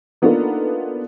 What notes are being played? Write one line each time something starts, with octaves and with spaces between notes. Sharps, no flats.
A#3 B3 D4 D#4 F4 A4